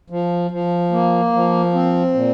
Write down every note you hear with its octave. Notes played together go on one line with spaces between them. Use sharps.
F3
F3
A#3
F3
C4
A#2